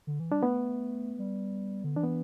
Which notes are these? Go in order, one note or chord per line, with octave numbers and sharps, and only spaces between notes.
D3
E3
G3 D4
A3 B3
G3
D3
E3 D4
B3